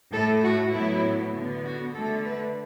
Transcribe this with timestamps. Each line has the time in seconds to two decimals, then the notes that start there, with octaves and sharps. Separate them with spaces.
0.12 A2 A3 A4
0.43 F#4
0.72 A2 F#3 B3 E4
1.34 D3 B3
1.64 F#4
1.94 D3 A3 A4
2.24 B4